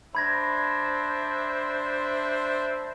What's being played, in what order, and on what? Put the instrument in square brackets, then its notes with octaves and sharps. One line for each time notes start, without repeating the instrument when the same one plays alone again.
[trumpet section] D4 C5 E5 [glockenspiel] B5 G#6 A#6